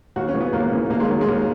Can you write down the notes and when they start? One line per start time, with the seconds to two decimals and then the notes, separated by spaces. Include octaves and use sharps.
0.16 D#2 F#4
0.28 C#4
0.34 C#3 E3
0.41 B3
0.53 D#2 A#3
0.72 C#3 E3
0.90 D#2 A#3
1.00 G#3
1.09 D#3 F#3
1.21 G#3
1.28 D#2